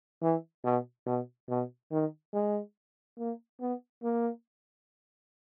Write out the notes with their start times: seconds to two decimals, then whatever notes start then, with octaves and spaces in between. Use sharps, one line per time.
0.22 E3
0.64 B2
1.06 B2
1.49 B2
1.91 D#3
2.33 G#3
3.19 A#3
3.60 B3
4.03 A#3